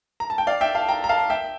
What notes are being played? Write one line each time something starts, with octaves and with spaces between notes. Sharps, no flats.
A#5
A5
G5
D5 F5
E5 G5
F5 A5
G5 A#5
A#5
F5 A5
E5 G5